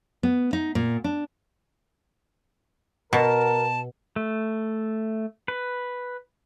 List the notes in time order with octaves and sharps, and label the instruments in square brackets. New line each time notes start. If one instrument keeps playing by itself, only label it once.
[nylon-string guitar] B3
D#4
A#2
D4
[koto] B2 [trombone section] A#4 [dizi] A5
[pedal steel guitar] A3
B4